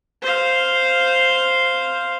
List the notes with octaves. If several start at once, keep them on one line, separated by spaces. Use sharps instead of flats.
C5 F5